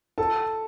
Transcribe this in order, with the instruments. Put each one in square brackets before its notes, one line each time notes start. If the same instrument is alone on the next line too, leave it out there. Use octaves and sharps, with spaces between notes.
[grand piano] A4 A5